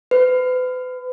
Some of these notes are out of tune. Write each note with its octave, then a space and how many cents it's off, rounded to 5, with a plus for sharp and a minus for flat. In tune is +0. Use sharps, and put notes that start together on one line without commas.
B4 +40